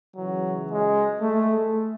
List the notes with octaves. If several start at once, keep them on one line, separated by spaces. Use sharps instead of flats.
C#2 C#3 E3 F#3
G#3
A3